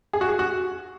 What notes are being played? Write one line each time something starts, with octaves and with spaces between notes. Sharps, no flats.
G#4
F#4
G#4
F#4